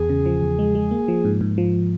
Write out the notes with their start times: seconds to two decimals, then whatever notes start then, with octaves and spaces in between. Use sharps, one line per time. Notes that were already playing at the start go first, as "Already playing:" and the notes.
Already playing: E2 G#4
0.10 C#3
0.26 F3
0.43 E2
0.59 G#3
0.75 G#3
0.91 A#3
1.08 F3
1.25 G#2
1.41 G#2
1.58 F3